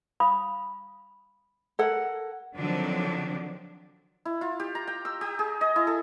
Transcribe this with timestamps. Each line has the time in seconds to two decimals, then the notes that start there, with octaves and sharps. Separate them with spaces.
0.20 F5 B5 D#6
1.79 A4 A#4 D5 E5 F#5
2.55 D3 D#3 F3 F#3 C4 D4
4.25 E4
4.41 F4
4.60 G4
4.75 A#5
4.87 G5
5.05 E6
5.21 G4
5.39 G#4
5.61 D#5
5.76 E4
5.87 A4